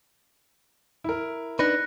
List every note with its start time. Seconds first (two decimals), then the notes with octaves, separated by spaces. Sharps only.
1.04 E4 A#4
1.59 D4 D#4 B4 F#6 A#6 C#7